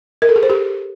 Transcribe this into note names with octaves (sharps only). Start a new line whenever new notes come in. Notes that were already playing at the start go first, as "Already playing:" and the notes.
A#4
A4
G#4
C5
G4